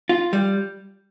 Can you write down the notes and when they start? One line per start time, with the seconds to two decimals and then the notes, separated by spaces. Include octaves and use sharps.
0.09 F4
0.33 G3